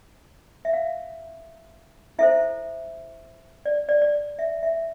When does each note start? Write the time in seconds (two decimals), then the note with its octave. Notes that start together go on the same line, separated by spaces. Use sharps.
0.65 E5
0.73 F5
2.19 E4 A4 C5 E5
3.65 D5
3.89 D5
4.02 D5
4.39 E5
4.63 E5